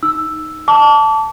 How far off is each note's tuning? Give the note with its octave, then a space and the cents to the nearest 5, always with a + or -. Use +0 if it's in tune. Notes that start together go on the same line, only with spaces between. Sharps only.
D#4 +0 E6 +0
A5 +0 D6 -35